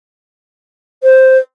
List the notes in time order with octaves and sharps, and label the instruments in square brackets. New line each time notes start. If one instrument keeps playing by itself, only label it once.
[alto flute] C5